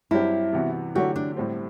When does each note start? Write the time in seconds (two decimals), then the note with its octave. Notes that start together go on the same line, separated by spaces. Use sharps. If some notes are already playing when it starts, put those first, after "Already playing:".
0.11 G2 F#3 C4 E4 G4
0.53 C3 E3 B3 F#4
0.95 D3 F#3 A3 E4 F#4 G4
1.16 D4
1.37 A2 G3 C4